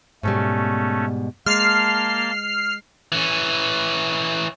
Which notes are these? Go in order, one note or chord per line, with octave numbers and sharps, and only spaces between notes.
G#2 B2 G3 A3 C#4
G#3 A#3 A5 C6 F6 C7
E3 C#4